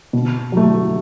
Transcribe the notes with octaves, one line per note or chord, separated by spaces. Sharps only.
B2
F#3 A3